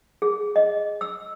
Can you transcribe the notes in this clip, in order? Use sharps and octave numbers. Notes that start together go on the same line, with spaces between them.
G#4
D#5
E6